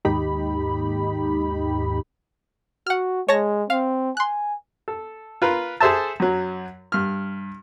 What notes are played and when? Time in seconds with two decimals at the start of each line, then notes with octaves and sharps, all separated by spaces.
0.05 D#2 G#2 D#4 G4 B5
2.87 F#4 F#5 F6
3.29 G#3 C#5 A5 A#6
3.70 C4 F5
4.17 G#5 C6 F#6
4.88 A4
5.42 F4 A#4 B4
5.80 G#4 A4 C5 E5 A5
6.20 F#2 F#3
6.92 G2 F6